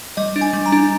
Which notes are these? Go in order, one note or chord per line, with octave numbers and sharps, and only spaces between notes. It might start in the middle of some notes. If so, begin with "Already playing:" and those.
G3 D#5
D4
G#5
G3
A#5
D4